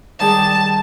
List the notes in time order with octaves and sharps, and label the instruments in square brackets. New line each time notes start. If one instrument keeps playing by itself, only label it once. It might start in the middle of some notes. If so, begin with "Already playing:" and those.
[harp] D#3 G3 G#4 [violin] A5